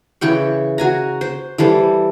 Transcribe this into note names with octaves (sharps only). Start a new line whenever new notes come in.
C#3 E3 G5 C#6
F#4 G#5 A#5
C5
E3 G3 A4 C5